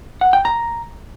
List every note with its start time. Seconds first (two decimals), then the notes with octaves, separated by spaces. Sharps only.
0.21 F#5
0.33 G5
0.45 A#5